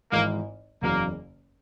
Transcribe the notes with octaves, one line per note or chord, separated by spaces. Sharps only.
G#1 G#2 E3 G#3 A#3
F#1 E2 C#3 F#3 A#3